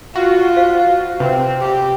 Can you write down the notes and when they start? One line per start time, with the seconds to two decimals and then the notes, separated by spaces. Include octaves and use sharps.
0.15 F4 F#4
0.57 C5 F5
1.20 C3 C4 B4
1.61 G4